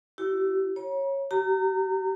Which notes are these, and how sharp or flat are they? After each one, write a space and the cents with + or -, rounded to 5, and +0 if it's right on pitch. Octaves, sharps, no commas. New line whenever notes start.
E4 +15 G4 -40
C#5 -15 A#5 +40
G4 -45 A#5 -25